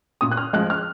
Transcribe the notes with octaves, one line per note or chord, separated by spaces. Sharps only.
A#2 D#6
F#6
F6
F3 G#3 F#6
F6